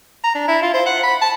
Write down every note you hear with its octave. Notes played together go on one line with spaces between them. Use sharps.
A#5
D4
E4
F4
C5
F#5
B5
A5